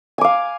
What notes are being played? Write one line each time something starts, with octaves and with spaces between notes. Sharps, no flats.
F5 G#5 D6